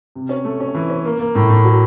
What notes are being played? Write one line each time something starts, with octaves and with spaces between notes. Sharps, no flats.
C3
C#4
A3
C#4
E3
C#4
A#3
A#3
A2
A2
F#3